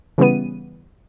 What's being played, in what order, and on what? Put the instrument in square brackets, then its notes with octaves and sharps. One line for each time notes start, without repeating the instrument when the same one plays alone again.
[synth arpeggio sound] C#3 E3 G3 B3 D#7